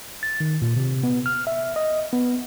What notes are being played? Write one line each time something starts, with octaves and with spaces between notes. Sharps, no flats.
A6
D#3
A#2
C3
B3
F6
E5
D#5
B3